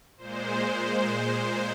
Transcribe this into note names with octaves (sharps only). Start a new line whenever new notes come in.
A#2 G#3 C5
C5